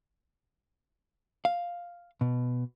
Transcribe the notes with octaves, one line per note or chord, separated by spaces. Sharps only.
F5
B2